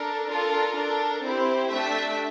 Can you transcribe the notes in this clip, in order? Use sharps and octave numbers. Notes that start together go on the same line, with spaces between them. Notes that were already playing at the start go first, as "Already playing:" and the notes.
Already playing: D4 A4 A#4
D4 F4 A4 A#4
D4 A4
C4 E4 G4 C5
A3 D4 G4 E5